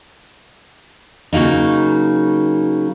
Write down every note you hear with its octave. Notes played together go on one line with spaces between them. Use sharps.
C#3 F#3 A#3 D#4